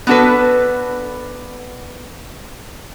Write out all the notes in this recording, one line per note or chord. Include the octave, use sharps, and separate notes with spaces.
B3 D4 F#4 A4 B4